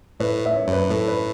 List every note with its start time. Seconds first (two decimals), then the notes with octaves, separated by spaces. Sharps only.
0.20 A2 B4
0.45 E5
0.55 C#5
0.67 F#2
0.72 B4
0.90 A2 A4
1.08 B4